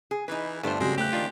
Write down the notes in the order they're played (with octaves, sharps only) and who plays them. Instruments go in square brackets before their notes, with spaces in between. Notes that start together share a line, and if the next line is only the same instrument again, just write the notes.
[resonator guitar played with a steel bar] G#4
[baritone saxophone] E3 [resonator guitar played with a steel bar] D#4 B4
[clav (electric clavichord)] G1 C5 [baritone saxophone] G2 [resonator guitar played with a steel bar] A3 D4
[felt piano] C#3 F#3 G4 [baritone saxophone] G#3 [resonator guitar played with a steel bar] C4
[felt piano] A3 F#6 [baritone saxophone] G4
[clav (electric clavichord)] D#3 D4 F4